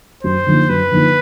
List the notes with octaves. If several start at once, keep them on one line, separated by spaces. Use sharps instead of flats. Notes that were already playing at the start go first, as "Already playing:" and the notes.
F#2 C5
D3 F3 A#3 D#4
F#2 B4
D3 F3 A#3 D#4